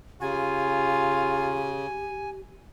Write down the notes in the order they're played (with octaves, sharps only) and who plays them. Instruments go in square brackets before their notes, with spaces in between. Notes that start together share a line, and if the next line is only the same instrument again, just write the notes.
[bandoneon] C#3 [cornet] F4 [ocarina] G4 [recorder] G#5